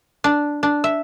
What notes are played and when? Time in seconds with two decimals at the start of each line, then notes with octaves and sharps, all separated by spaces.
0.24 D4
0.63 D4
0.84 E5